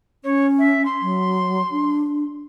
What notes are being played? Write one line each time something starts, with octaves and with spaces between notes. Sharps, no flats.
C#4 C#5
E5
C6
F#3
D4